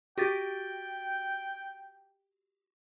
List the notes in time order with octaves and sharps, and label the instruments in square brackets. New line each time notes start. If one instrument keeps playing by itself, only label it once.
[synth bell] F#4 G4 A6 [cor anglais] G5